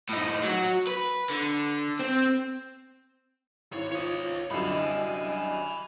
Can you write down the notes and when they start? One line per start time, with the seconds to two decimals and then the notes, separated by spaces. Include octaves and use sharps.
0.09 A2 D#4
0.43 F#3 F#4
0.87 B4
1.30 D3
1.99 C4
3.72 G#1 E4 C#5
3.92 F4 C#5 D#5
4.51 C2 F#2 D3 D#5 G#5 B5